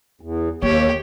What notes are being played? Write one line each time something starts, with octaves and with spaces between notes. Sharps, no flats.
E2
D#2 A#3 G4 C#5